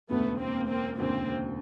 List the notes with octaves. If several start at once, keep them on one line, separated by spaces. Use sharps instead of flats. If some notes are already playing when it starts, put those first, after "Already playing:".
E1 D2 C#3 A3 B3
A#3 C4
A#3 C4
E1 D2 C#3 A#3 C4